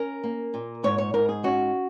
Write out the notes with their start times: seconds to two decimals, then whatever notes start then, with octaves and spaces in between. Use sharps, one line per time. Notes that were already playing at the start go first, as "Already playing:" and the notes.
Already playing: C#4 A#4
0.24 A#3
0.54 A#2
0.83 G#2 C#5
0.98 C#5
1.14 G#2 A#4
1.29 G#4
1.44 C#4 F#4